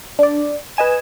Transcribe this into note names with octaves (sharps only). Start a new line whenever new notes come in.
D4 D5
B4 D#5 G#5 E7